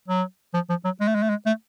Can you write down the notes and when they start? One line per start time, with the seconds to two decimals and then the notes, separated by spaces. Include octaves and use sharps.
0.08 F#3
0.54 F3
0.69 F3
0.84 F#3
1.00 G#3
1.07 A3
1.15 G#3
1.23 A3
1.29 G#3
1.46 A3